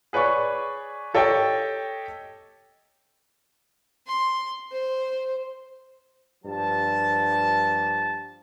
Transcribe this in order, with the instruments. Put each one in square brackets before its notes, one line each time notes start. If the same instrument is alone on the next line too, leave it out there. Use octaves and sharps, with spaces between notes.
[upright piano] G#4 B4 C#5 D5 C#6
G4 A4 C#5 D#5 G5
[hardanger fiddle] C6
C5
[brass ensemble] G2 F3 G4 A5